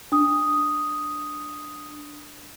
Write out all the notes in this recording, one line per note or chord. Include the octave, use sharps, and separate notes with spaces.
D4 D#6